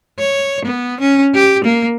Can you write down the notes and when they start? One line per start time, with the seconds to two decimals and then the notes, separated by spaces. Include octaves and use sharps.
0.19 C#5
0.65 B3
1.00 C#4
1.34 G4
1.64 A#3